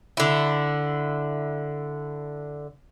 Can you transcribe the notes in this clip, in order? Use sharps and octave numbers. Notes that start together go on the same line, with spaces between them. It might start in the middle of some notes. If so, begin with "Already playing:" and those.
D3 E4